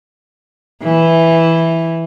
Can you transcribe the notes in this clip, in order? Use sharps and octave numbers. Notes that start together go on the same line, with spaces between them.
E3